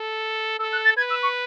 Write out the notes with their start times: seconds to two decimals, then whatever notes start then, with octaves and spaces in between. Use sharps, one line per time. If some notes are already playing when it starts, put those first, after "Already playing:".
Already playing: A4
0.59 A4 E6
0.72 F#6
0.85 A6
0.97 B4 G#6
1.10 E6
1.23 C#6